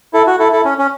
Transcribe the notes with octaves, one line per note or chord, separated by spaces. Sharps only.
E4 A4
F#4
E4 A4
E4 A4
C#4
C#4